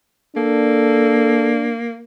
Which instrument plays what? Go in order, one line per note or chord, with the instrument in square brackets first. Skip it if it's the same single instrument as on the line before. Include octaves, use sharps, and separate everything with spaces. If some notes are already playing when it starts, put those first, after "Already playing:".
[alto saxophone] A#3 [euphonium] D4 [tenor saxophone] A4